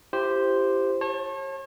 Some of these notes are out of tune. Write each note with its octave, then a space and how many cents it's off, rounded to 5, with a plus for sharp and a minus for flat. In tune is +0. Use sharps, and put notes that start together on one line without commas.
E4 +35 G4 +0 C5 +0
C#5 -40 A5 +0